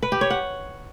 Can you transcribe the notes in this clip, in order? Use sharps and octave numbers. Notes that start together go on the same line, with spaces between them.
B4
G4
C#5
F#5